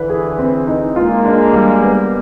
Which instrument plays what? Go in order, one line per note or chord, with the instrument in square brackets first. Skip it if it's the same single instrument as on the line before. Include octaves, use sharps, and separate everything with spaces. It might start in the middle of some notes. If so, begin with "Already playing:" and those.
Already playing: [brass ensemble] D3 E3 [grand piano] B4
[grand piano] G#4
C4
D#4
[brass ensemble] G#3 A#3 [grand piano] F4
[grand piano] D4
G3
B3